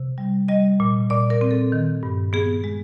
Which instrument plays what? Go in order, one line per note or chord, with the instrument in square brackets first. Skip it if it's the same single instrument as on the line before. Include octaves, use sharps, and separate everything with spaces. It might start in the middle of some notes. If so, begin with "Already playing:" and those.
Already playing: [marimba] C3
G3
G3 D#5
A#2
A#2 D5
A#4
C4
A4
D#3
G2
B3 G#4
G#3